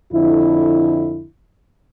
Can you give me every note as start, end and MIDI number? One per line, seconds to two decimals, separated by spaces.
0.13 1.25 41
0.13 1.25 50
0.13 1.25 64